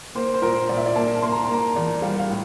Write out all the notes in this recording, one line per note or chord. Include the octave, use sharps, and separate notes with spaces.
A#3 C5
C5
A#2 A#4
A#2 D5
E5
D5
A#3 A5
A#3 C6
A#5
A5
A#3 A#5
E2 D5
G3 F5
F5
A2